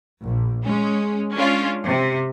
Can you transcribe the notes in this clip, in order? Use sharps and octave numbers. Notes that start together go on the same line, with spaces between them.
A#1
G#3 C#4
G#3 C#4 D4 F4
C3